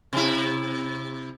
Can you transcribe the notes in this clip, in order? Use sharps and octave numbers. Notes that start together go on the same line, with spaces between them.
C3 E4